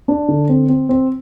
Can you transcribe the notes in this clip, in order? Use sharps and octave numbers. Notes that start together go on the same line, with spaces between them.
D4
D3
C4
C4
C4